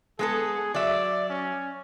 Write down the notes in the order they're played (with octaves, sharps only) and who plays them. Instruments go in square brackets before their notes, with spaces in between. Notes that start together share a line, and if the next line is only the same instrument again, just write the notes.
[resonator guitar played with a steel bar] G#3 B3 A4 [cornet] G#4
[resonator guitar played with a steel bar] F#3 E5 [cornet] D5
[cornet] C#4